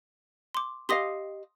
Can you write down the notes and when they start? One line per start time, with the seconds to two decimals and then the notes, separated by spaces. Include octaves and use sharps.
0.54 C6 D6
0.89 G4 D#5 F5 C6 D#6 A#6